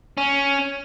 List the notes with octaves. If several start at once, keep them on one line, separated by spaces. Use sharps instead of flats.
C#4